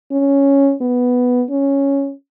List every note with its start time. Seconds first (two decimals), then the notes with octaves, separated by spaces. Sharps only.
0.12 C#4
0.81 B3
1.50 C#4